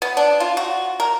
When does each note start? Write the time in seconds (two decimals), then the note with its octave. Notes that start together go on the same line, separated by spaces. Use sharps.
0.02 B3
0.17 D4
0.40 F4
0.57 F#4
1.00 A#4